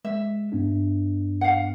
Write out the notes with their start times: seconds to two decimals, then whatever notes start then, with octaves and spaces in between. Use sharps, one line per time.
0.05 G#3 E5
0.52 G2 B3 D4
1.41 F5 F#5